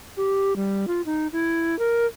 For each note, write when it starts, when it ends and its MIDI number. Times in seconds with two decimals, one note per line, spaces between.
0.17 0.56 67
0.56 0.85 55
0.88 1.02 65
1.06 1.27 63
1.33 1.78 64
1.79 2.06 70